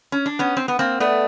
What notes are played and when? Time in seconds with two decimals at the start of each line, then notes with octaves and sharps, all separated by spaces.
0.12 C#4
0.26 D4
0.39 B3 C#4
0.57 C4
0.68 B3
0.79 A#3 C4
1.00 A3 B3 D5